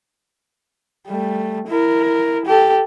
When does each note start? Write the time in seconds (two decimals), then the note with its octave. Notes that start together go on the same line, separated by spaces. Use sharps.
1.08 G3 A3
1.68 E4 A#4
2.46 G4 A4